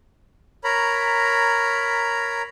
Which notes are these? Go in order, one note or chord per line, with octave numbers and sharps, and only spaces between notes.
A#4 C#5 A#5 B5